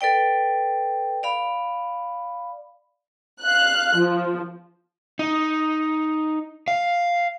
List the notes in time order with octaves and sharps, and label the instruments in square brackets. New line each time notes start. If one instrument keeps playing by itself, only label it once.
[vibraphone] A4 B4 D5 G5
D5 F5 B5
[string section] F5 F#6
F3
[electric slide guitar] D#4
F5